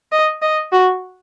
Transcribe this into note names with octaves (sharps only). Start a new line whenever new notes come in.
D#5
D#5
F#4